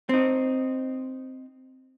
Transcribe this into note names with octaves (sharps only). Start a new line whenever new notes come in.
C4 D#4